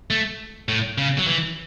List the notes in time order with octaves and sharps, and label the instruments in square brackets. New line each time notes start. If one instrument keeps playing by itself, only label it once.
[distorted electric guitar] A3
A2
C#3
F#3
E3